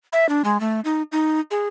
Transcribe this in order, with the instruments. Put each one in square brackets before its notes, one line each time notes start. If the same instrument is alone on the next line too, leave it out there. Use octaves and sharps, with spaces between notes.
[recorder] E5
D4
G#3
A3
D#4
D#4
G#4